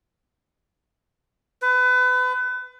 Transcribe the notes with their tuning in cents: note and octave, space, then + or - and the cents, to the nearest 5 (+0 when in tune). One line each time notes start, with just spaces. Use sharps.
B4 +30